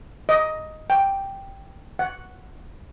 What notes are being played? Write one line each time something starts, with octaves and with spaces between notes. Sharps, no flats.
D#5
G5
F#5